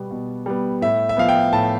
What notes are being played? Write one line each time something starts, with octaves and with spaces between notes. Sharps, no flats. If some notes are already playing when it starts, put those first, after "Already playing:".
Already playing: B2 G3 B3
B2
G3 B3
A2 E5
E5
F3 B3 F5
G5
A2 A5